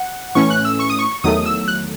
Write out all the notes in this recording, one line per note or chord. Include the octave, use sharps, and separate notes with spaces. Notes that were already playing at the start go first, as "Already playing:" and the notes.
Already playing: F#5
A2 E3 A3 C#4 C#6
F#6
E6
C#6
D#6
C#6
E2 D#3 F#3 A3 D#6
E6
F#6